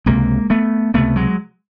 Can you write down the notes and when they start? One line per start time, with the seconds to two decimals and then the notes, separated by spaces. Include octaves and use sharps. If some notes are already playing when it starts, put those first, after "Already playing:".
0.06 C#2 C3 G#3 A#3
0.50 A3 B3
0.94 C#2 C3 A3 B3
1.16 F#3 G#3